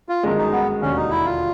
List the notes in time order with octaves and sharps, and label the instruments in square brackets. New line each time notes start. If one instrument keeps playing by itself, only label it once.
[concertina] F4
[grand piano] G1 F#2 D#3 G#3
[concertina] D#4
B3
[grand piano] E1 D#2 D3 [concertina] C#4
[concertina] D#4
E4
F4